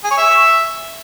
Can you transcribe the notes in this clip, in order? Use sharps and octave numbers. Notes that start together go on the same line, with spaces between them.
G#4
C#5
E5